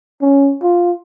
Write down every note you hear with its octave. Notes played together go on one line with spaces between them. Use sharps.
C#4
F4